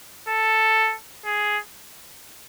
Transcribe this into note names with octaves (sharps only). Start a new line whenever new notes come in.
A4
G#4